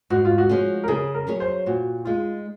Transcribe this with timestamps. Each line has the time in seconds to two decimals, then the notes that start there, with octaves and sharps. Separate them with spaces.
0.10 G#2 F#4
0.25 F4
0.38 F#4
0.49 F3 G#3 C#4
0.84 A#4
0.88 C#3 G#4
1.14 A#4
1.27 F#3 C#4 G#4 C#5
1.40 C5
1.66 A#2 F#4
2.05 G#3 D#4 F4